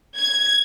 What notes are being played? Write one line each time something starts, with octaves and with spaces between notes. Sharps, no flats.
G#6